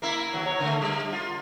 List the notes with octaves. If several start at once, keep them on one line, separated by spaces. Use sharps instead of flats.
A#3 E4
D#2 F#3
C#5
D3 A3
G3
F4